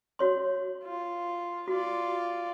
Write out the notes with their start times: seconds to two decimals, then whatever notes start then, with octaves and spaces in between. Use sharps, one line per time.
0.19 F#4 C#5 C6
0.84 F4
1.68 F4 F#4 D5